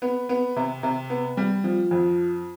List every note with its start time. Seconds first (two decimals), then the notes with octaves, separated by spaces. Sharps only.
0.02 B3
0.29 B3
0.56 C3
0.83 C3
1.10 B3
1.37 G3
1.64 F3
1.91 F2